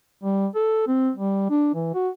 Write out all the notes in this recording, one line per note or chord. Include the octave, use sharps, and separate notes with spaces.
G3
A4
C4
G3
D4
E3
F#4